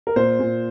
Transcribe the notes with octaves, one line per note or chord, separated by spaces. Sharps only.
A#4
A#2 C5
A#2